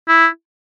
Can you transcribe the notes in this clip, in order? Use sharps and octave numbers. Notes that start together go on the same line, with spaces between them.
E4